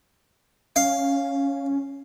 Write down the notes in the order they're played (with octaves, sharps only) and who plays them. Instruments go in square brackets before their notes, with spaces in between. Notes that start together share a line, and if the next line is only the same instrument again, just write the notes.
[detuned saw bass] C#4 [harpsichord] F5